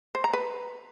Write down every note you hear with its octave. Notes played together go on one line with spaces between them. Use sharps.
C5
A#5
B4